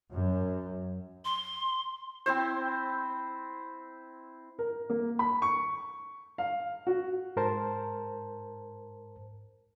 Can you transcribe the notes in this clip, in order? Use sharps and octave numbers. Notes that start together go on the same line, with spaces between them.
F#2
C6
C4 E4 C5
A#4
A#3
B5
C#6
F5
F#4
G#2 A#4 C5 A5